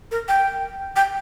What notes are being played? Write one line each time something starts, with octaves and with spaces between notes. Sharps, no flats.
A#4
G5
G5